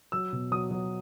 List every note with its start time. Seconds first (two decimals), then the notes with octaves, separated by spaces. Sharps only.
0.12 F#3 E6
0.33 B2
0.52 F#3 D#6
0.71 F#3